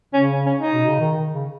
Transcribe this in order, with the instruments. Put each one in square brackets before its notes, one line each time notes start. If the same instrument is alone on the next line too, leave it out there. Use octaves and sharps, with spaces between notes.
[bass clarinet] C#3 [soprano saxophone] C#4
[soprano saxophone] C#4
D#4
[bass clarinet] B2
C#3
D#3
C#3